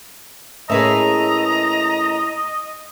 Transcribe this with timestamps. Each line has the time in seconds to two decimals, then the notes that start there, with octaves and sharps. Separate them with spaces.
0.70 A2 A#3 C#4 G#4 B4 D#5 E5 A#5